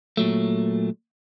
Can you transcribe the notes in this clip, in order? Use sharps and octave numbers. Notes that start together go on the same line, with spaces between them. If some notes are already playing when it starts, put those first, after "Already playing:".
A#2 F#3 A3